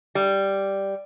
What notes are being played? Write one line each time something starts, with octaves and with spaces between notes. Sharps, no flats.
G3